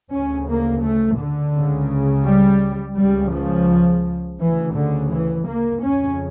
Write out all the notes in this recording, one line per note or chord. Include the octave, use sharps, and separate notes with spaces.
D2 C#3 C#4
A#3
A3
D3
C#2 C#3
G3
C#2 C#3 G3
F3
D2 C#3 E3
D3
E3
A#3
F2 C#3 C#4